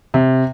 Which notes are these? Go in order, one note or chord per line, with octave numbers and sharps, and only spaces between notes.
C3